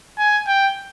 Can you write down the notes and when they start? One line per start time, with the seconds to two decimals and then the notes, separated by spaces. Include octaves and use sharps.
0.19 G#5
0.47 G5